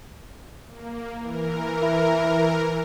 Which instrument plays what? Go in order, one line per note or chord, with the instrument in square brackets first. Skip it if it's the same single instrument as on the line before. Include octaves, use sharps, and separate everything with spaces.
[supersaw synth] A#3
E3 A#4
[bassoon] E4